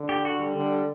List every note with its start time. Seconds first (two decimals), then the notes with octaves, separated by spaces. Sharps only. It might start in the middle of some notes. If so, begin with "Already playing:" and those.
Already playing: D3
0.09 G4
0.25 F#4
0.39 G3
0.56 D3